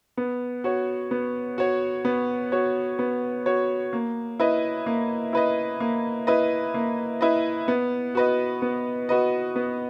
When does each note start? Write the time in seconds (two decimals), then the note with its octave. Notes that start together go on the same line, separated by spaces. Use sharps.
0.17 B3
0.64 F#4 C#5
1.11 B3
1.58 F#4 C#5
2.05 B3
2.52 F#4 C#5
2.99 B3
3.46 F#4 C#5
3.93 A#3
4.40 E4 B4 D#5
4.86 A#3
5.33 E4 B4 D#5
5.80 A#3
6.27 E4 B4 D#5
6.74 A#3
7.21 E4 B4 D#5
7.68 B3
8.15 F#4 B4 D#5
8.62 B3
9.09 F#4 B4 D#5
9.56 B3